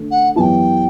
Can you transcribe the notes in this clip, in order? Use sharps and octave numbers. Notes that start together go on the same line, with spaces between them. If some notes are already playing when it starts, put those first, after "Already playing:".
Already playing: D3 A3 C#4
F#5
F#2 E3 B3 E4 G4 G5 A5